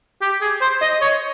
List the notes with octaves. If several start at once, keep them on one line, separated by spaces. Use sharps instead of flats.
G4
G#4
C5
D#5
C#5